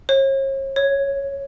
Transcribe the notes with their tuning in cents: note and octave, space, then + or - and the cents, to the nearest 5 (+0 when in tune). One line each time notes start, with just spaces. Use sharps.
C#5 -40
C#5 +0